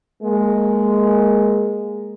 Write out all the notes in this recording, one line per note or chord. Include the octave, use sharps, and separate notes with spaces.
G#3 A#3